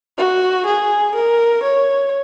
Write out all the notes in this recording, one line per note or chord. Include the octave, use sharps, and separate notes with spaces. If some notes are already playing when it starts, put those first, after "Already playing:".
F#4
G#4
A#4
C#5